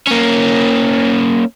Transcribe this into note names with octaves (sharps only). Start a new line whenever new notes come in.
A#3 C#4